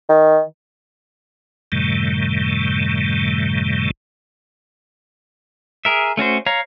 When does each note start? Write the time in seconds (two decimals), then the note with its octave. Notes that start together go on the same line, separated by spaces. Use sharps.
0.09 D#3
1.72 F#2 A2 C3 D#3 G3 A3
5.85 G#4 A#4 E5
6.17 A3 C#4 F#4 C5
6.46 C#5 F5 A#5